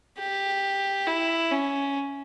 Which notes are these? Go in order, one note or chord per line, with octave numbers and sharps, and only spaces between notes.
G4
E4
C#4